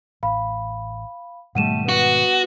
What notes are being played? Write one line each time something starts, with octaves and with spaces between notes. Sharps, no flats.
A1 F5 B5
G#2 B2 D#3 G3 A3 F#5 D#7 E7
B3 F#4